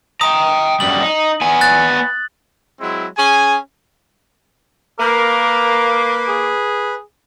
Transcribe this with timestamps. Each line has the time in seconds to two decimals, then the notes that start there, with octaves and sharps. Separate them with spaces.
0.21 G5 A#5 D#6
0.80 F#2 G3 F#7
1.01 D#4
1.41 B3 G#5
1.61 F#6 A6
2.80 F#3 G#3 C4 E4
3.17 C#4 G#4 G#5
4.99 A#3 A#4 B4 D6
6.28 G#4